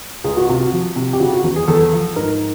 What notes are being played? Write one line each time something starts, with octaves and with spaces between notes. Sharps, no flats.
C#2 G#4
F#4
C3 F4
F#4
F3
C3
G4
C#3 F#4
F#4
E2
G#4
E2 A4
F3
G#2 A#4